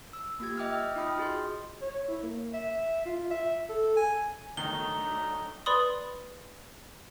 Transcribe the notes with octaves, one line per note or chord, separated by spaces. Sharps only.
E6
A#3 F4 G4 G#6
D#5 E5 G5 D6 E6 F6
D#5
D#4 F4 G5 B5 D#6 F6
F#4 G#4 D#5 C6
C#5
E4
A#3
E5
F4
E5
A4
G#5
D#3 F#3 A3 D4 D#4 G7
B4 D5 B5 C6 D#6